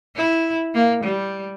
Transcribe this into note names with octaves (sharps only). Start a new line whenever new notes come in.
E4
A#3
G3